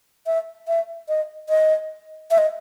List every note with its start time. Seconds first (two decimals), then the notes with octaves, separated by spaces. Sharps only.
0.26 E5
0.68 E5
1.08 D#5
1.49 D#5
2.31 E5
2.38 D#5